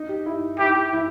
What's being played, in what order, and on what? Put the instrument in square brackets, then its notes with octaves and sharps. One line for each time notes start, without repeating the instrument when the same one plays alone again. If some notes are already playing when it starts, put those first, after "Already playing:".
Already playing: [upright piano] D#4
G4
E4
[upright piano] E4 [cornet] G4
[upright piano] E4